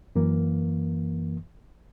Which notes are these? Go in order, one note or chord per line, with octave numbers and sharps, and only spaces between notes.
F#2 E3 A#3